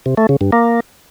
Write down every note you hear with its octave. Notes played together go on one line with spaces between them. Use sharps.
C3
A3
C#3
G2
A#3